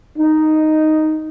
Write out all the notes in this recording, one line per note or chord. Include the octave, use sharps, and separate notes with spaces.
D#4